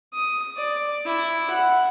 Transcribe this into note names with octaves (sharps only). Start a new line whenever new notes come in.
D#6
D5
E4
F#5